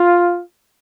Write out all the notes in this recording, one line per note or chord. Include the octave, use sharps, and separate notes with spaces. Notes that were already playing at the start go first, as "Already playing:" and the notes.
Already playing: F4